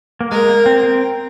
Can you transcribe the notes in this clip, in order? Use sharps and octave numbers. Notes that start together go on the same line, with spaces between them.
A#3
G#3 A#4
A#3
C4
C4